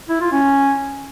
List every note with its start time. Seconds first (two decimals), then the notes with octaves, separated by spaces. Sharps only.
0.09 E4
0.21 F4
0.32 C#4